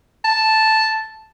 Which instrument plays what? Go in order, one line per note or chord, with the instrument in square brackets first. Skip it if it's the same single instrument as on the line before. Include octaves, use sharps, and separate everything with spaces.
[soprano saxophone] A5